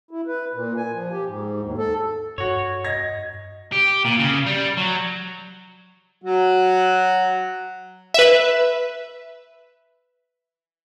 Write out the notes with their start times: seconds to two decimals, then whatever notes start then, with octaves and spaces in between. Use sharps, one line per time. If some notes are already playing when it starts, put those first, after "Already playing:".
0.11 E4
0.27 B4
0.55 A#2
0.77 G#5
0.92 F3
1.12 G4
1.26 G#2
1.63 D#2
1.78 A4
2.38 G2 F#4 C#5
2.84 D#5 G#6 A#6
3.72 G4
4.05 A#2
4.19 C#3
4.46 G3
4.77 F#3
6.24 F#3 F#4
8.14 B4 E5